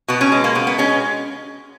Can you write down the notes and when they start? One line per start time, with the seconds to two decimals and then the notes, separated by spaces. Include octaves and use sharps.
0.08 B2 B3
0.21 C#4
0.32 G#3
0.44 A#3
0.55 B2 B3
0.67 B3
0.78 G#3 C#4